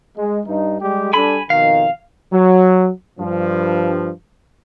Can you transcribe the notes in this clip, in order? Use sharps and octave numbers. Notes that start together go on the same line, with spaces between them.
G#3
G2 D#4
G3 G#3 G4
G3 D4 A4 G#5 B5
F2 B2 D#3 F5
F#3
G2 F3